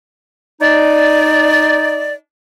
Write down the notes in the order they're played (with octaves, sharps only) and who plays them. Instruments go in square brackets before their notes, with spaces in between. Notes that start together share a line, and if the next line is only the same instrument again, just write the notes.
[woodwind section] D#4 D5